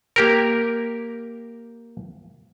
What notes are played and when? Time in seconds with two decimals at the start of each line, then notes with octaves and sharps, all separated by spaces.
0.16 A#3 G4 A#4